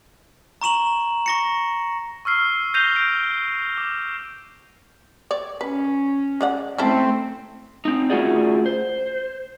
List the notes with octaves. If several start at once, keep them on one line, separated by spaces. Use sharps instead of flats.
A#5 C#6 E7 F#7
C#6 A#6 C#7
C#6 E6 F6 C7
G6 A#6 C7 D#7 F7 G7
G6 A#6 D7
D6
C#5 D5
C#4 B4
G#3 D5 F#5
A3 C4 C#4 E4 A4
C4 D#4
A3 C#4 F4 F#4 G#4 D5
C5